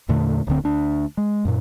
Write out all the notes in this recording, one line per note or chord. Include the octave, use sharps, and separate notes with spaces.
E2 A#2 D3 A3
D1 D2 D3 C4
D2 D4
G#3
F#2 A#2